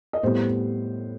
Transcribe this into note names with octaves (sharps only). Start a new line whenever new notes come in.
D#5
A2 G3 B3 C5